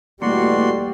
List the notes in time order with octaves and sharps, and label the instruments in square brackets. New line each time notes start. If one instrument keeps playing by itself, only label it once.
[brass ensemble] E2 B2 A3 [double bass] G3 [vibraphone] A#3 [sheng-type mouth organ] F#4 D5 C6